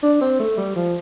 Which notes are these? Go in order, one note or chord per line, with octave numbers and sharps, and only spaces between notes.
D4
C4
A3
G3
F3